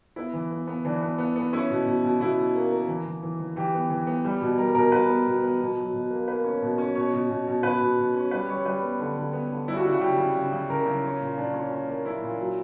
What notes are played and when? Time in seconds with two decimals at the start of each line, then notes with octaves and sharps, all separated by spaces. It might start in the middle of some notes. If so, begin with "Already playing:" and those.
0.16 B3 E4
0.33 E3
0.51 B3
0.67 B3
0.85 E3 D4
1.01 B3
1.18 B3
1.36 B3
1.53 C#4 E4
1.70 B2
1.86 B2
2.04 B2
2.20 B2 E4
2.38 B2
2.55 A#3
2.72 A#3
2.88 E3
3.06 E3
3.23 E3
3.39 E3
3.56 E3 G4
3.74 B3
3.90 E3
4.07 B3
4.25 G3
4.41 B2
4.58 G3 A#4
4.75 B2 A#4
4.92 B2 B4
5.09 B3
5.27 B2
5.42 B3
5.61 B2
5.77 F#3
5.93 B2
6.10 A#3
6.28 A#3 B4
6.44 C#4
6.62 B2
6.78 C#4
6.95 B2 C#5
7.13 B2
7.29 B2
7.47 B2
7.63 B2 B4
7.80 B2
7.98 B2
8.15 C#4
8.31 G3 B4
8.49 G3 C#5
8.65 G3 B4
8.83 B3
8.99 D3
9.17 D3
9.33 B3
9.51 D3
9.68 G3 E4
9.77 F#4
9.85 C#3 E4
9.93 F#4
10.01 C#3 G4
10.18 C#3
10.35 C#3
10.52 C#3
10.70 C#3 A#4
10.86 C#3
11.04 C#4
11.20 A#2
11.37 A#2 D4
11.54 C#4
11.71 C#4
11.88 A#3
12.05 C#4 E4
12.22 A#2
12.40 F#3